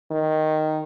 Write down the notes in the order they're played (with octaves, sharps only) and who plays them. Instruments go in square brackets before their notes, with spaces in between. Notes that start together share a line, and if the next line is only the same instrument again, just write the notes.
[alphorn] D#3